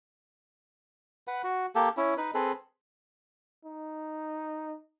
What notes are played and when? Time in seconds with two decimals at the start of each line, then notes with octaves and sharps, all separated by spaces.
1.27 B4 F#5
1.44 F#4
1.75 A#3 G4 A4
1.97 C#4 E4
2.17 D#4 B4
2.34 C4 G#4 A4 B4
3.65 D#4